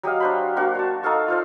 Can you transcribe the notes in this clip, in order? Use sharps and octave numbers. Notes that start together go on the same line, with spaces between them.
F#3 G4 D#5 F5
D4 C5 B5
A#3 D4 F#4 C5
C#5 A5
D#4 A4 F5 C#6
F4 C5 D5